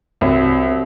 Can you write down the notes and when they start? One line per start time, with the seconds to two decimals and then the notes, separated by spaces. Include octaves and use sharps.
0.21 C2 C3 F#3 C4
0.69 C3